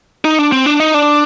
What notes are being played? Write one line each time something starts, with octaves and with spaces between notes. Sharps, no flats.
D#4
D4
C4
D4
D#4
D4